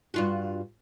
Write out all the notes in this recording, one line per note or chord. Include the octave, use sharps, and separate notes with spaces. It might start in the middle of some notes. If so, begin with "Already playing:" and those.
G2 F4 F#4